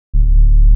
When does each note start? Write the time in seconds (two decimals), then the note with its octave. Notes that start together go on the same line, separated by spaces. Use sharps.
0.14 D1